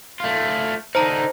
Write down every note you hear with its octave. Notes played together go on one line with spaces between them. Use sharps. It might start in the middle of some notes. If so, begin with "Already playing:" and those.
A3 F4
D3 D#4 C5 A5 A#5